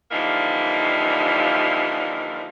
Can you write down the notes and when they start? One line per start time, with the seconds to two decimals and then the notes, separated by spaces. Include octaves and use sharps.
0.11 D3 E3 F3 G3 A#3 D#4